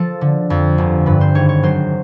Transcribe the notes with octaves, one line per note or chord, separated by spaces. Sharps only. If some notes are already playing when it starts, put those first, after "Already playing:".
Already playing: F3 A4
D3
F2
G1
G2 B4
C5
G#1 C#5
C#5
F#3 C5